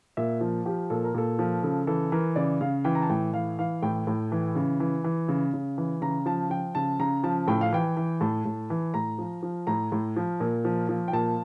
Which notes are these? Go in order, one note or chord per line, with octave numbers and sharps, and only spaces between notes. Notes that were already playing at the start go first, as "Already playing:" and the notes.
A#2 E5
F3
F3 G4
A#2 A4
A#4
A#2 A4
F3
C#3 A4
E3 A4
E3 A#4
C#3 D5
C#3 F5
E3 G5
A#5
A5
A2 G5
E3 F5
E3 F5
A2 G5
A2
E3
C#3
E3
E3
C#3
C#3
E3
C#3 A#5
F3 A5
F3 G5
C#3 A5
C#3 A#5
F3 A5
A2 G5
F5
E3 G5
E3
A2 A5
A2
E3
A2 A#5
F3
F3
A2 A#5
A2
F3
A#2
F3
F3
G5
A#2 A5